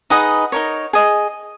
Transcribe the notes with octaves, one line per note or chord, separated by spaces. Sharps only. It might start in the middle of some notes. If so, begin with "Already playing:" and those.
D#4 G#4 B4 D#5 F#5
D#4 A#4 C#5
G#4 D#5